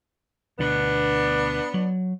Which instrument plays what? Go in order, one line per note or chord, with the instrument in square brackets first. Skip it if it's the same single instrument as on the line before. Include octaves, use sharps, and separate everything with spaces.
[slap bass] D2 B2 [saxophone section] B3 D4
[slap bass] F#3